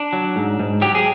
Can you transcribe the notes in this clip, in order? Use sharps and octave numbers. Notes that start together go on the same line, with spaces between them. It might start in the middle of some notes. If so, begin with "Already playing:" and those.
Already playing: D4
F#3
G#2
G#2
F#3 G4
G#4